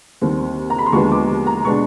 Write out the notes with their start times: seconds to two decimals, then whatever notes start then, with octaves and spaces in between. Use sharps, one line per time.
0.22 D#2 D#3 G3 C4
0.70 A#5
0.79 B5
0.86 C6
0.93 D#2 D3 F3 G#3 B3 C#6
1.11 D6
1.47 A#5
1.64 B2 G#3 B3 D4 C#6